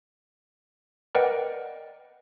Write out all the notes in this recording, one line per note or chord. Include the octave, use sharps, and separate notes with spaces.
A#4 B4 D5 D#5 F#5 G5